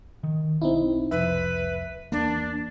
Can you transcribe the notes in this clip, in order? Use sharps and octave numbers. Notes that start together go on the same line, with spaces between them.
D#3
B1 C4 D#4 E4
C2 F2 B4 E5
E2 A#3 D4